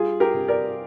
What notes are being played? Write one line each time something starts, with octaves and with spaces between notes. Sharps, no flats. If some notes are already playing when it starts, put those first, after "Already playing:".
Already playing: G3 F4 G#4
G4 A#4
C3
A#4 D5